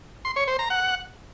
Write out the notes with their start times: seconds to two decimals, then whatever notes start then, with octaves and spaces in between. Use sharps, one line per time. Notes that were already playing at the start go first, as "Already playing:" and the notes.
0.25 C6
0.36 C#5
0.48 C5
0.59 A#5
0.70 F#5